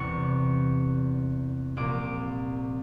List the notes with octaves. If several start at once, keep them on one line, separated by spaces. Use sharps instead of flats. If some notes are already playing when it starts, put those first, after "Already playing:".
Already playing: E2 C3 E3 G3 C#6
C2 A#2 F3 A#3 D6